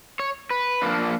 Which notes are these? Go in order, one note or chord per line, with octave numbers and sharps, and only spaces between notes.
C#5
B4
F3 A#3 D4